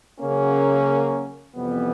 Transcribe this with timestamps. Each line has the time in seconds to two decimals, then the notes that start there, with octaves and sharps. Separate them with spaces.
0.20 C#3 F#3 A#3 C#4
1.56 F2 C3 E3 G3 B3